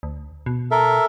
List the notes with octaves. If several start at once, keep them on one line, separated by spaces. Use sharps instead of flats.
D2
B2
A4 A#4 E5